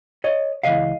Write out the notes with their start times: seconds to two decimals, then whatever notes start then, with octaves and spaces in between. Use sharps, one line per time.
0.24 C#5 D#5
0.63 C#2 C#3 E3 D#5 F5